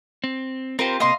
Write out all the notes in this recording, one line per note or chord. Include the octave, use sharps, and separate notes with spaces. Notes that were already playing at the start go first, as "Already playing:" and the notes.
C4
C4 F4 G4 A#4 C5
C3 A#3 D#5 F5 C6